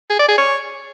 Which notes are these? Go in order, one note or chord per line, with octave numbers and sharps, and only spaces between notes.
G#4
D5
G#4
C#5